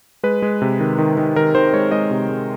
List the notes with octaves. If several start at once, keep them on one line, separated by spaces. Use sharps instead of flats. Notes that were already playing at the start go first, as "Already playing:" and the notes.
G#3 B4
G#3
C3
D#3
D#3
D#3
D#3 A#4
D#3 C5
G#3 C#5
G#3 D#5
C3
G#3